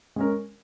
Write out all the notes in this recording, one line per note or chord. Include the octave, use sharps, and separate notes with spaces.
G#3 C#4 A#4